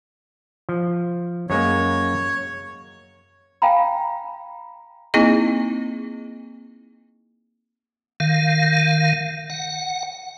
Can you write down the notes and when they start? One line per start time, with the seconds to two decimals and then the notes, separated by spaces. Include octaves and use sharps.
0.69 F3
1.50 F#2 G#3 A#3 C#5
3.62 F5 G5 G#5 A#5 B5
5.14 A#3 C4 D#4 E4 G#4 D#5
8.20 D#3 F5
9.50 F#5